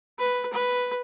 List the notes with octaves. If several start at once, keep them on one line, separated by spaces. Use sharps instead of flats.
B4
B4